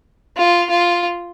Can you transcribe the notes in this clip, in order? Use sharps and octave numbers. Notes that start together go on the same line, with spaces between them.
F4
F4